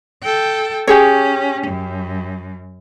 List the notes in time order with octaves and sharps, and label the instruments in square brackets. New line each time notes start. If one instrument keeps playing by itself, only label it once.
[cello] A4 G5
[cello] C#4 [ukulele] G4 G#4 C#5
[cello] F#2